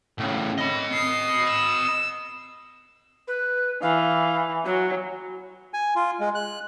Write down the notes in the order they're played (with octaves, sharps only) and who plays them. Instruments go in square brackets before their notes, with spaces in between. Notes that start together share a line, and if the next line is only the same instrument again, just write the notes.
[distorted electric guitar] A2 C#3
D#5 B5
[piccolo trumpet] D#6 [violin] C7
[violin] E6
[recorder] B4
[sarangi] E3 [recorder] F5
[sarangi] F#3 [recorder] F#4
[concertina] G#5
F4
G#3
F#6